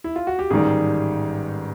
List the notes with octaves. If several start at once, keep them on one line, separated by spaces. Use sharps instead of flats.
E4
F4
F#4
G4
A1 G#2 D#3 G3 G#4